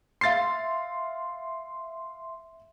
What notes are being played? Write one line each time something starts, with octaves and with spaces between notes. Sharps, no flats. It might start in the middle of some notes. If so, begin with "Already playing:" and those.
E5 F5 C6 A6 C7